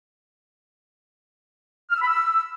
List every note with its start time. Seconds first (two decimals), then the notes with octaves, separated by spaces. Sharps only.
1.90 F6
1.96 E6
2.02 B5
2.07 E6